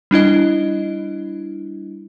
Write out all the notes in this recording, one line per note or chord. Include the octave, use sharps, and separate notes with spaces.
G3 D4 E4 D#5